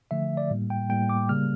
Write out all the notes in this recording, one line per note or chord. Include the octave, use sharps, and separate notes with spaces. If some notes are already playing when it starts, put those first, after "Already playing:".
D3 F3 A3 E5
D5
A2 G3 A#3
G5
A2 G3 A#3 G5
D6
C#3 G3 A#3 F6